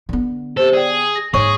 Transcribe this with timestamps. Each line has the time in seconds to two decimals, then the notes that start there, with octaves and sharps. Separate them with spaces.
0.09 D3 B3
0.57 G4 A4 C5
0.73 G#4 D5 G5
0.94 D#7
1.15 A#6
1.34 G#2 G#4 C#5 C#6